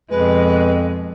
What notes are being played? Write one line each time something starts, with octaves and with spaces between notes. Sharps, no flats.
F2 B2 F3 G#3 B4